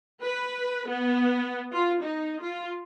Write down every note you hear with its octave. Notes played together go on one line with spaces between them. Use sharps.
B4
B3
F4
D#4
F4